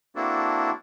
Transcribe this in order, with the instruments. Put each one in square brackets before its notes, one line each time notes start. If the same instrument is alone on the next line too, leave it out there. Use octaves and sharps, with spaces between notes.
[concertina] A#3 C4 D4 E4 F#4 A4